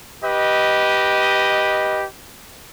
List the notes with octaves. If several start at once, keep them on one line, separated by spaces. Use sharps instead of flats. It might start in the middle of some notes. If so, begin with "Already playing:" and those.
G4 B4 D#5